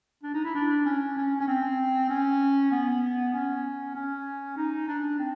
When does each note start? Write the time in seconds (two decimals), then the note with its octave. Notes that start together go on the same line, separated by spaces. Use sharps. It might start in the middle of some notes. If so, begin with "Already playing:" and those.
0.23 D4
0.34 D#4
0.44 E4
0.55 D4
0.85 C#4
1.17 C#4
1.40 C#4
1.48 C4
2.09 C#4
2.72 B3
3.34 C#4
3.95 C#4
4.57 D#4
4.88 D4
5.19 C4